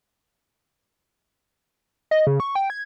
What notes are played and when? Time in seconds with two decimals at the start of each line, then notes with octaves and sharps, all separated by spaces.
2.11 D#5
2.27 C#3
2.40 C#6
2.55 G5
2.70 G#6